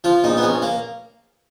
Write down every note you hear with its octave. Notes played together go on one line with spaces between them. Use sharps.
F3 F4
A#1 D#4
B3
A#1 C#4
A#3